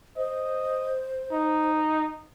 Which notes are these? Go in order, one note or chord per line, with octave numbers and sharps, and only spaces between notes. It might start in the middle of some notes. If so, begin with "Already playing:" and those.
C5 D#5
D#4